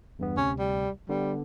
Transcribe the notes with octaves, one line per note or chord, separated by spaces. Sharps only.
E2 G2 B3
D2 C3 C#4
G3
D3 G3 B3